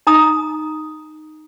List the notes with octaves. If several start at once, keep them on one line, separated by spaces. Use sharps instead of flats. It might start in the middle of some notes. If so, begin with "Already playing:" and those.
D#4 A#5 D#6